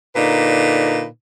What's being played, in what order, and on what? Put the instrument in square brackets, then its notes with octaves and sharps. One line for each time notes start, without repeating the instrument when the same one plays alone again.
[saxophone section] A#2 D3 D#4 B4